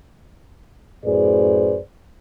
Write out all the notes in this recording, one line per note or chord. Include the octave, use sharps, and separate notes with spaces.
F#2 A2 G#4 B4 C5 D5